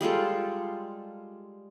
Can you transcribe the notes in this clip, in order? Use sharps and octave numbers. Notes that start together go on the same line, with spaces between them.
G3 G#3 F4 A4